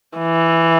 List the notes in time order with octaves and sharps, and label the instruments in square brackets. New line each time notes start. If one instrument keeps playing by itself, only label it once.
[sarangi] E3